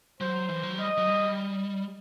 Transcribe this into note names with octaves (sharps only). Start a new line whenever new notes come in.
F#3 C5
E3
F#3
G3 D#5
F#3
G3